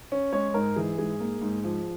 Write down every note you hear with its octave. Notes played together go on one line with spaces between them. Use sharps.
C#4
G#3 C#5
G#2 A#4
E3 G#4
G#2 G#4
A#3
G#2
F3